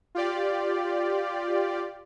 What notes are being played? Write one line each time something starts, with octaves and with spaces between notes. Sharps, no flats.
F4 G4 D5